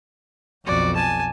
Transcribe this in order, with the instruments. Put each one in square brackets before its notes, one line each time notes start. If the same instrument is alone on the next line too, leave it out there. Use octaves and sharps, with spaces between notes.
[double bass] B1 F2 [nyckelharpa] F#4 D5
[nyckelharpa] G#5 A5